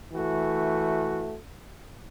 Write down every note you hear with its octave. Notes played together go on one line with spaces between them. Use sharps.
E3 A3 F#4